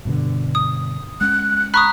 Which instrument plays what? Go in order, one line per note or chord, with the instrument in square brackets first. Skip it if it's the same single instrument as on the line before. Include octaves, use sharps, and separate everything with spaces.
[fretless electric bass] G2 B2 D3
[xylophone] D#6
[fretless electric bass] G#3 C#4 [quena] F#6
[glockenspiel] A#5 F#6 B6 [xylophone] B5 C#6 D#6